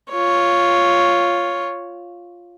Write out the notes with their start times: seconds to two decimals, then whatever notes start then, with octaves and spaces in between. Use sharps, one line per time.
0.12 F4 C#5